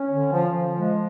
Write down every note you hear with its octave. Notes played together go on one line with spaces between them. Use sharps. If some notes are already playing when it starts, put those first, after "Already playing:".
Already playing: C#4
D3
F3
F3
G#3